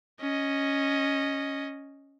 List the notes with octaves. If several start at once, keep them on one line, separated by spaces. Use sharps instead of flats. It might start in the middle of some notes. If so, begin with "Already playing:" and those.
C#4 D#5